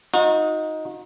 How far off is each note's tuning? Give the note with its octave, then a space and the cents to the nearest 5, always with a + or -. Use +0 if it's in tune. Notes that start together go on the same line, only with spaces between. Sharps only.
D#4 +10 F#4 -40